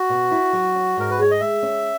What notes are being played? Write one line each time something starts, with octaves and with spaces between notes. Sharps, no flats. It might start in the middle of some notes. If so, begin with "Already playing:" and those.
Already playing: F#4
B2
E4
F#3
C#4
G#2 A#4
B4
G#4 C#5
D#5
G#3 E5
C#4